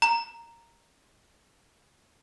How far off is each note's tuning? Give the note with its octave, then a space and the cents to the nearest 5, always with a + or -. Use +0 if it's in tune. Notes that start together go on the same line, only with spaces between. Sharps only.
A#5 -5